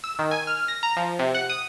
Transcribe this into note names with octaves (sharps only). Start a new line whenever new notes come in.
E6
D#3
G#5
F6
A#6
A#5
F3
C3
F#5
D#6